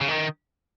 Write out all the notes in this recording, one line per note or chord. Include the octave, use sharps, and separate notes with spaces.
C#3
D#3